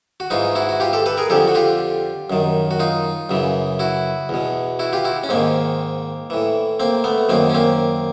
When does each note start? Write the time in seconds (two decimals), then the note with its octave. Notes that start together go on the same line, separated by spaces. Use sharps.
0.20 F#4
0.30 G#2 E3 D#4 F4
0.55 E4 F#4
0.69 F#4
0.80 F4 G4
0.93 G4 A4
1.06 A4 B4
1.18 G#4 A#4
1.30 F2 D3 G4 A4
1.48 F#4
1.55 F4 G4
2.30 F#2 D#3
2.71 F#4
2.80 D#4 F4
3.29 F#2 C#3 E3
3.79 E4 F#4
4.29 E2 B2
4.79 E4 F#4
4.93 F4 G4
5.05 E4 F#4
5.24 C#4
5.29 G#2 D#3 A#3 C4
6.30 A2 E3
6.80 A#3 C4
7.04 A3 B3
7.29 F#2 D#3 A#3 C4
7.49 C#4
7.54 A#3 C4